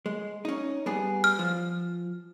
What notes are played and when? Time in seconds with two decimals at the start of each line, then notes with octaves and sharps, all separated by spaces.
0.06 G#3
0.45 C#4 D#4
0.86 G3 B3 G#4
1.24 F6
1.39 F3